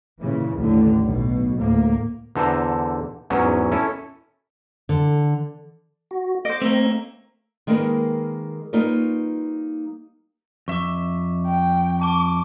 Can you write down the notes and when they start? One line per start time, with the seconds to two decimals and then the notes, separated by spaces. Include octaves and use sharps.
0.19 A#2 C#3 E3
0.58 A1 D#2 A2 D3
1.02 B1 B2
1.58 D2 A2 A#3
2.35 E2 D3 A4 C5 A#5
3.30 E2 G#2 F#3 B3 C#4
3.72 C#4 E4 A4
4.89 D3
6.11 F#4
6.45 C5 D#5 D6
6.62 A3 A#3 C4
7.67 D#3 G#3 A#3 D#4 A#4 B4
8.73 G3 A#3 D#4 F4 B4 C#5
10.68 F2 E5 C#6 D6
11.46 G5
12.02 A5 C#6 D6